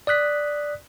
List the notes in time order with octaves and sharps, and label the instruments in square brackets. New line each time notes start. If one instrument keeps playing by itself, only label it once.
[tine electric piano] D5 D#6 F#6 B6